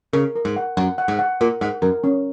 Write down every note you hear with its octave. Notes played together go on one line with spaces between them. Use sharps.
C#3 A#4
A#4
G#2
F#5
F#2 F#5
F#5
G#2
F#5
A#2 A#4
G#2 F#5
F#2 A#4
C#4